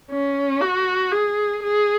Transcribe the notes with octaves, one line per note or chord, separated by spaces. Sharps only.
C#4
F#4
G#4
G#4